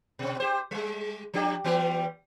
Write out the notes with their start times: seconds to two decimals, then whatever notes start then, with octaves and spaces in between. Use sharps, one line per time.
0.19 B2 C4
0.40 G4 C5
0.71 G3 G#3
1.34 F3 D4 G4
1.64 E3 G3 B3